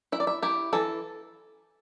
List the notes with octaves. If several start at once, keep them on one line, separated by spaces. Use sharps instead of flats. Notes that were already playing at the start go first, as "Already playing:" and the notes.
E4 E5
D5
E5
E4 G4
E3 A4